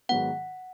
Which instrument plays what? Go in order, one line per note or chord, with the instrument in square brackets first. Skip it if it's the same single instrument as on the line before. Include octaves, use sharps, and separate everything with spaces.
[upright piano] G#2 D#3 F#3 B3 [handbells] F#5